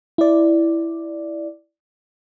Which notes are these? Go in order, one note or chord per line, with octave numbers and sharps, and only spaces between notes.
E4 D5